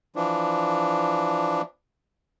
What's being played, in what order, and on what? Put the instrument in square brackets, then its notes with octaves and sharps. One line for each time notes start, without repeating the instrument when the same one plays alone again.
[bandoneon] E3 F3 D4